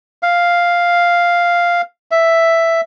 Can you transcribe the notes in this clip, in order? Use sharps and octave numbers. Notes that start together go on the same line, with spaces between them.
F5
E5